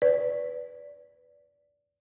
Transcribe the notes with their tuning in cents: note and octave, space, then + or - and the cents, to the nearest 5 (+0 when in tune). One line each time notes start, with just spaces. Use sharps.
B4 +10 D5 -20